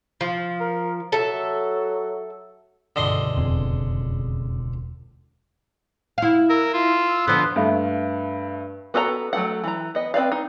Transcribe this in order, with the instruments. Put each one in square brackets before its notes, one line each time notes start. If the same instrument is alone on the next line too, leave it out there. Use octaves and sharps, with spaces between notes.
[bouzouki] F3
[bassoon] A#4
[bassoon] F#3 [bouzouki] A4 E5
[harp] C#2 G2 B2 [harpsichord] D3 D#5 C6
[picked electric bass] E1 [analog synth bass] F2 [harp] G#4
[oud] E4 F5
[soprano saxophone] A#4 [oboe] E6
[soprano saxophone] F4
[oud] D3 F3 [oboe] B3 [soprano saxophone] C5
[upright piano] G2 A3 [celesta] E5 F5
[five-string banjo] B3 F#4 A4 E5 A#5
F#3 A3 A4 F#5
E3 A#5
B3 D#5
C4 B4 D5 F5
D#4